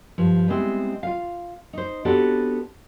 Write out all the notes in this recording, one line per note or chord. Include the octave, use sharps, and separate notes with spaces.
G2 F3
G3 G#3 B3 C4 E4
F4 F5
D#4 C5
B3 C4 D4 F#4 G4 A4